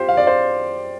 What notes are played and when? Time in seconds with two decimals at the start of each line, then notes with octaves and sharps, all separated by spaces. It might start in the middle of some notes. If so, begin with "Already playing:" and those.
Already playing: F4 G4 C5
0.09 F5
0.17 D5
0.27 C5